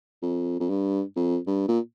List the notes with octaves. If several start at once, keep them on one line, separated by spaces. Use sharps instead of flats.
F2
F2
G2
F2
G2
A#2